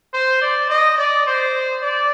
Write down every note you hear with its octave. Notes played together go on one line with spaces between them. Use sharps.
C5
D5
D#5
D5
C5
D5